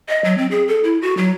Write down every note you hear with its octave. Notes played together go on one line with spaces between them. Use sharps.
D#5
F#3
C4
G#4
A4
E4
F#4
F#3